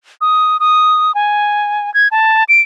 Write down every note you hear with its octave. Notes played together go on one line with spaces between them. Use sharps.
D#6
D#6
G#5
G#6
A5
D7